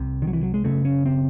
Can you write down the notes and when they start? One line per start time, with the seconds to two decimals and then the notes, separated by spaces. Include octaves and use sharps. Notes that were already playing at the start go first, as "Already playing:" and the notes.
Already playing: C2 C3
0.22 D#3
0.27 F#3
0.33 E3
0.43 F#3
0.54 G#3
0.64 F#1 F#2 C#3 A3
0.85 C#4
1.06 C4